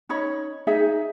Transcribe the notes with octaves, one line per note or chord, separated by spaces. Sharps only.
C#4 D#4 C#5 B5
D#4 G#4 E5